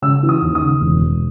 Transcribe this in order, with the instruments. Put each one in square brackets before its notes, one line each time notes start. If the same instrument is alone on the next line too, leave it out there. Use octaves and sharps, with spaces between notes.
[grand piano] C#3 E6
E3
D#6
D#2
D#6
C#3
E1
E1